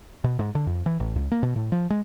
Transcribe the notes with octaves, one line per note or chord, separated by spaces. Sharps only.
B2
G#2
D3
F2
E3
A1
C#2
A#3
B2
A2
F3
G#3